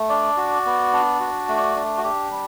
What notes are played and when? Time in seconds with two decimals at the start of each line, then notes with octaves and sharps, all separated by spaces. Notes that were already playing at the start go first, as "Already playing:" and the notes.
Already playing: A3
0.09 D4 D5
0.37 F#4
0.65 B3
0.93 D4
1.20 F#4
1.48 A3
1.75 D4
1.97 F#4
2.04 D4 G4
2.31 G3